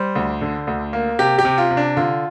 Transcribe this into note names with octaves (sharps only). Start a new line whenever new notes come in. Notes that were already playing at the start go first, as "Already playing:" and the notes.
Already playing: G3 C5
D2
D3
D2
A#3
C3 G4
G4
C3
F4
C3
D4
D3 F4